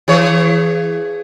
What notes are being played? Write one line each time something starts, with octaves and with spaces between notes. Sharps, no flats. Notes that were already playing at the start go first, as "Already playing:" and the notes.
E3 G#4 C#5